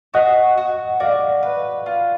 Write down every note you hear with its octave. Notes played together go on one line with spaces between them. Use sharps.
F#4 D#5 F#5
F#4
F#4 D5 F5
B4
F4